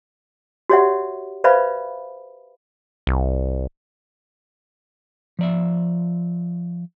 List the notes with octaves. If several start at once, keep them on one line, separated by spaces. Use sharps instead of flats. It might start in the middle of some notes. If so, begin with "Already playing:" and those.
F#4 G4 C#5 D5 E5 F#5
B4 C5 D5 E5 F5 B5
C2
F3 D5 E5